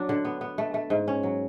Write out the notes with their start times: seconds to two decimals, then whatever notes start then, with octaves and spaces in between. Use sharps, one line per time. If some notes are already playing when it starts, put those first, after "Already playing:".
Already playing: F#3 D4
0.09 D3
0.25 B3
0.41 B3
0.58 A3
0.74 A3
0.90 G#2
1.08 C#4
1.23 F#3